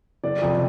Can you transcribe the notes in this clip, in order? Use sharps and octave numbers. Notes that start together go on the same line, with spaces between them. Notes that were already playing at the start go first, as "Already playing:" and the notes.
F#1 D5
F2 C3